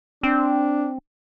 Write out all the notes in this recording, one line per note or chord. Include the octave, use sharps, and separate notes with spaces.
C4 D4